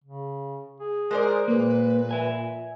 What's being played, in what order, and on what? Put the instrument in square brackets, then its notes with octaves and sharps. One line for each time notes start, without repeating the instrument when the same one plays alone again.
[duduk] C#3
G#4
[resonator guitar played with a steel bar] G#3 C5 D5 [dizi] A#4
[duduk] A#2 [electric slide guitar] A#3 [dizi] B4
[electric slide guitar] E5 G#5